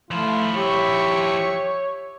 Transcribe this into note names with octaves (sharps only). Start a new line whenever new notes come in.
F3 A3 E4 F4
G4 C#5 E5 C#6